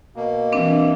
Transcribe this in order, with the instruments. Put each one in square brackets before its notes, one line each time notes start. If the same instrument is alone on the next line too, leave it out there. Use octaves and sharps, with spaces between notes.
[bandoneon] B2 A#3
[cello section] E3 [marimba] C4 D4